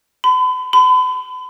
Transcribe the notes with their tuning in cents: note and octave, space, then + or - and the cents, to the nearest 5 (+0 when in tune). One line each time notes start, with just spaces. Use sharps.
B5 +40
B5 +40